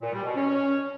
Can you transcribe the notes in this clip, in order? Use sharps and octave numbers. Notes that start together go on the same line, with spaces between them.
A#2
G3
B2
C#4
C#4